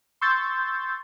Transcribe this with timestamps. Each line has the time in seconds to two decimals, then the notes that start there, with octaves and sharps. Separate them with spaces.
0.21 C6 C#6 E6 G6 A6